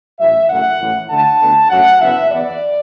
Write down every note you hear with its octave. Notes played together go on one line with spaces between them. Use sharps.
A1 A2 F#3 E5
F#1 F#2 F#3 A3 F#5
A1 A2 E3 A3
D2 D3 A3 A5
D2 D3 B3
F#2 F#3 A3 F#5
F#1 E2 E3 B3 E5
E2 E3 B3 D5